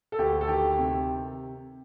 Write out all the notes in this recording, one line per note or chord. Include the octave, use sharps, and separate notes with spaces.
A4
D2 G4
A4
D#3 G4
C3